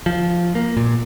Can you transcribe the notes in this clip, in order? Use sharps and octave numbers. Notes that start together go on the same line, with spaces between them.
F3
A#3
A#2